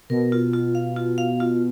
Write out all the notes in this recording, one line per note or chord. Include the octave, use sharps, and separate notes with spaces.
B2 A#4
F4
F4
F5
F4
F5
F4